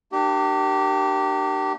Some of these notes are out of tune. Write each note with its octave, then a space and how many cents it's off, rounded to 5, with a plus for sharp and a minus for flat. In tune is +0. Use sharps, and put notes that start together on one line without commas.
A#3 +0 D4 +35 G4 -20